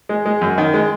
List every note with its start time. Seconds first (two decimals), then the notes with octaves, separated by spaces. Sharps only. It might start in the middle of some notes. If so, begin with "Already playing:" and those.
0.09 G#3
0.26 G#3
0.41 F#2
0.58 D#3
0.74 G#3